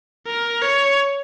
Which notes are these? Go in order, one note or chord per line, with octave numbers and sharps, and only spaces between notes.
A#4
C#5